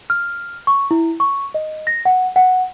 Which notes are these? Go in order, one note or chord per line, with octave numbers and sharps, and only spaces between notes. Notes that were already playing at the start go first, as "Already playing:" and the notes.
F6
C#6
E4
C#6
D#5
A#6
F#5
F#5